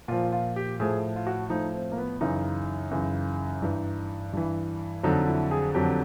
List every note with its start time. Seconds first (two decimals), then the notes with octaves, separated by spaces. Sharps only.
0.08 A#2 F3 F4
0.32 F4
0.56 G4
0.80 A2 F3 G#4
1.16 F4
1.27 F#4
1.50 A2 F3 D#4
1.74 C4
1.92 A#3
1.98 B3
2.21 F#2 C#3 E3 D#4
2.91 F#2 C#3 E3
3.62 G2 E3
4.33 G2 E3
5.03 F2 D3 F#3 D#4
5.27 E4
5.51 G#4
5.74 F2 D3 F#3 G4